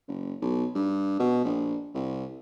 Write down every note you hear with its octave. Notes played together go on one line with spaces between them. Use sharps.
F#1
B1
G2
B2
A#1
C2